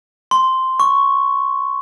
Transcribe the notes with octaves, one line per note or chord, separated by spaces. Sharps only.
C6
C#6